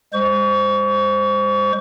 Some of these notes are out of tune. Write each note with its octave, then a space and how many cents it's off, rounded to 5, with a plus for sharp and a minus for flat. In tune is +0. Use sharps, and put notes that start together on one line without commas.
G#3 -40 C5 +0 C#6 +35